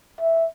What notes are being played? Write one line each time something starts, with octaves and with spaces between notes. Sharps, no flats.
E5